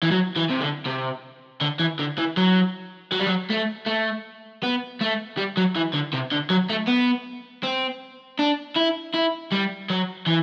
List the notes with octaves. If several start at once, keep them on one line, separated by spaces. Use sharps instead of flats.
E3
F#3
E3
C3
D3
C3
D3
E3
D3
E3
F#3
F#3
G3
F#3
A3
A3
B3
A3
G3
F#3
E3
D3
C3
D3
F#3
A3
B3
C4
D4
E4
E4
G3
F#3
E3